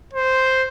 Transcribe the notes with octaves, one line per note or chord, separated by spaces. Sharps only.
C5